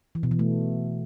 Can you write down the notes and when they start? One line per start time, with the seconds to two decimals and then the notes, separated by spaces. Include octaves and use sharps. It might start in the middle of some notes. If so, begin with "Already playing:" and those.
0.15 E3
0.23 B2
0.31 E3
0.39 A3